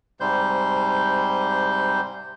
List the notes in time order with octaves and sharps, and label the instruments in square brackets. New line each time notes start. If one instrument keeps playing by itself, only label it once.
[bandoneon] G#2 C3 G3 C5 G6